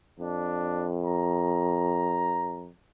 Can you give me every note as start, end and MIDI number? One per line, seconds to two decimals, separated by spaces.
0.19 2.72 41
0.19 0.87 62
1.05 2.67 82